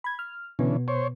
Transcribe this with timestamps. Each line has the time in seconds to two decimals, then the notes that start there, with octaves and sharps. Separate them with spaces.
0.04 B5 G#6
0.19 F6
0.59 B2 D3 E3 B3 C#4
0.88 C5 C#5